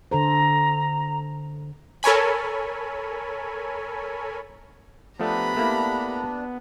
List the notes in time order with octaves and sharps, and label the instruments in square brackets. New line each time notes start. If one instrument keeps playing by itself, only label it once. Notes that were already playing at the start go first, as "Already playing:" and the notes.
[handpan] D3 A4 C5 [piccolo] A#5
[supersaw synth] A4 A#4 C#5 G#5 B5
[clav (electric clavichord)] F3 A3 [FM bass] B3 [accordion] D4 [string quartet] G4 A#5 B5
[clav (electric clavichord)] A3 A#3 E4